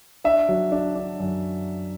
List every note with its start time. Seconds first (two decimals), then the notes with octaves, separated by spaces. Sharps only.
0.24 D4 E5
0.49 F#3
0.72 D4
0.95 D4
1.20 F#2